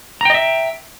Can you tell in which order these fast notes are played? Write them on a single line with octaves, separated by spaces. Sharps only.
A#5 G5 D#5 E5